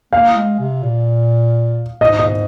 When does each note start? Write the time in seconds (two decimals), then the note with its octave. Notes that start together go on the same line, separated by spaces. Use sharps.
0.13 A#3 F5
0.36 G#3
0.60 C3
0.83 A#2
2.01 G#2 D#5
2.19 D#5